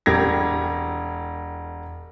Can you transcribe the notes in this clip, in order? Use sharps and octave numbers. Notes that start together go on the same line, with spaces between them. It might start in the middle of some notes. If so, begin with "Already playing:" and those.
E1 G4 A#4 G#6 A#6